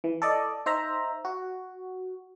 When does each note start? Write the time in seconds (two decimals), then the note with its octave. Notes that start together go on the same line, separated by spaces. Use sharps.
0.04 E3
0.22 A4 D5 D#5
0.66 D#4 C5 E5 A#5
1.25 F#4